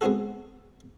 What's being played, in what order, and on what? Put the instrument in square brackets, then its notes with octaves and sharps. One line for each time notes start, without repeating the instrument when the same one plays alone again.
[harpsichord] G#3 B3 C4 D#4 F#4 A4